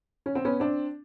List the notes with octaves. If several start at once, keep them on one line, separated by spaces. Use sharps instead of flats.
C#4
C4
B3 C#4
C4 D4